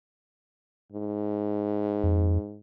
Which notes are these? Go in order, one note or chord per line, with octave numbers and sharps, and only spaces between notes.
G#2
F2